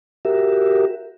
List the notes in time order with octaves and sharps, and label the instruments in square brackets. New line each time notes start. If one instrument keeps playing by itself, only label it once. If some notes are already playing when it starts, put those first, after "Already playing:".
[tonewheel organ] F#4 G4 A#4 E5